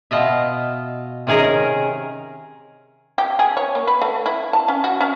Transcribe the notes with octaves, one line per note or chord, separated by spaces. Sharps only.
B2 F4 D#5 E5
C3 D#3 C#4 G#4 A#4 A#5
G4
G#4
C#5
A#3
B4
A3
E4
A5
C#4
F#4
C#4